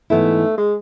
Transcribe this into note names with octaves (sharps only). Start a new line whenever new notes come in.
G#2 E3 A3 B3 E4
G#3